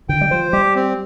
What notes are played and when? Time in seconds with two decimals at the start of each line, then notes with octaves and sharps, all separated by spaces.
0.09 D3 G5
0.21 G3
0.31 F3 C5
0.53 G3 G4
0.75 C4